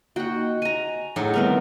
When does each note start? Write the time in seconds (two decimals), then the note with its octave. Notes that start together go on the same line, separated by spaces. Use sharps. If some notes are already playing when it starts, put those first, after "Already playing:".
0.16 A#3 D#4 F#4 F#5 G5
0.36 D#5
0.62 G#5 A#5
1.16 A2 F#3 D#4 G#4
1.34 D#3 G3 B3 C4 A#4